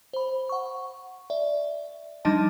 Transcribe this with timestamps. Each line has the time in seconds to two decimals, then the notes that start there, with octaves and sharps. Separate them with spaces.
0.13 C5 B5
0.49 F#5 C#6
1.30 D5 E5
2.25 F3 G3 D4 D#4 D#5 A5